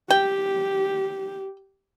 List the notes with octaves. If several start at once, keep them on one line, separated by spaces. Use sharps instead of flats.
G4 G5